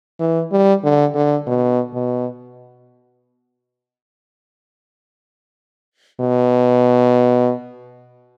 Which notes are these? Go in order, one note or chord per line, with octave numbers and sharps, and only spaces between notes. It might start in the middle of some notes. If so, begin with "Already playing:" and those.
E3
G3
D3
D3
B2
B2
B2